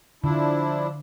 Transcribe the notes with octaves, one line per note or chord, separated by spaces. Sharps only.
D3 F3 D4 E4